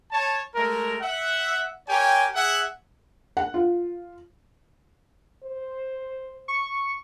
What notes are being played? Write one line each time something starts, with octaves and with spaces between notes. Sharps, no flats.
C#5 A5
G#3 A3 A#4
E5 F#5
G4 A#4 C#5 G5 G#5
G#4 E5 F#5
F#5
F4
C5
C#6